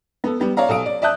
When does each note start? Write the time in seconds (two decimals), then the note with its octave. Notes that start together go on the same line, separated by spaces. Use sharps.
0.24 B3 A4
0.40 G3 B3 G4
0.57 C#5 D5 F5 A#5
0.69 B1 A4 F5 D#6 D7
0.86 D5
1.02 D5 E5 A5 D#6 F#6 G6